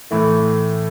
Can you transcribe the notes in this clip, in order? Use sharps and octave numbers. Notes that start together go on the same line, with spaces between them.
A2 E3 A3